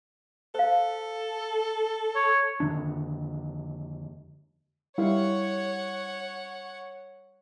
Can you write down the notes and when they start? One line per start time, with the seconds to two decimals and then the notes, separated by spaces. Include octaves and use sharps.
0.55 A4 C5 F5
2.15 C#5
2.60 F2 D3 D#3 D4
4.98 G3 E4 C#5 F5 F#5